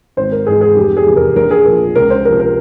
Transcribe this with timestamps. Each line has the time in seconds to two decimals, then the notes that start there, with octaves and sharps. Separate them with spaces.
0.17 G#1 C5
0.32 A#4
0.47 G#2 E3 G#4
0.61 G#4
0.76 F1 G4
0.97 G#4
1.07 E2 C3 E3
1.16 A#4
1.36 A#1 A#4
1.51 G#4
1.65 A#2 F3 A#4
1.95 C#2 A#4
2.10 C5
2.25 C3 F3 A#4
2.40 A#4